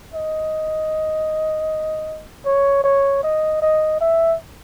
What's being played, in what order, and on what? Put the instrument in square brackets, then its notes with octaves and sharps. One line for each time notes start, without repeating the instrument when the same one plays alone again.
[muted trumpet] D#5
C#5
C#5
D#5
D#5
E5